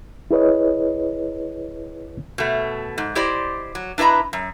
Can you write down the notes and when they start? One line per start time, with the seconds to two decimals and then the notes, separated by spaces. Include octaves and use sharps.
0.31 E4 G#4 B4 C#5 D#5
2.38 B2 A3
2.98 G#2
3.15 E4 G4 C5 D5 D#5
3.75 F#3
3.98 D4 E4 B4 D#5 A#5
4.33 F#2